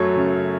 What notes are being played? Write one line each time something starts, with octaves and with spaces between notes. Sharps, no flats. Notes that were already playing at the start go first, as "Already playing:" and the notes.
Already playing: F#2 F#3 A3 C#5
C#3